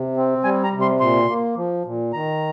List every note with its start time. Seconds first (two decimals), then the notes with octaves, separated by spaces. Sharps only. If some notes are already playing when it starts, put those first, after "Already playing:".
Already playing: C3
0.17 C4
0.44 G3 G#5
0.64 A#5
0.73 C3
0.81 C6
1.00 A#2 C6
1.28 A#3
1.56 F3
1.86 A#2
2.13 D#3 A#5